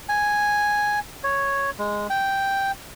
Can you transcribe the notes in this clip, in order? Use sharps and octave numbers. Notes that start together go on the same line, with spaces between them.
G#5
C#5
G#3
G5